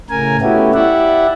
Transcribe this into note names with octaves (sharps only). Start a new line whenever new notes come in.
A2 C#3 A#4 G#5
A3 B3 C#4 E4 F#4 G4
E4 G4 D5 E5 F#5